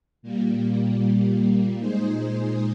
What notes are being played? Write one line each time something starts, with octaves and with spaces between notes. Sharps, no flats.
A#2 G3 A#3
A#2 G#3 D#4 G#4 C5